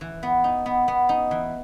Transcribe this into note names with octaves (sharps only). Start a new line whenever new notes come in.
E3
B3
D#4
B3
B3
D#4
E3